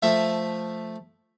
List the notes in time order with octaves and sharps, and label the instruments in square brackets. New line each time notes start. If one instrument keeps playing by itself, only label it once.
[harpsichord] F3 A3 E5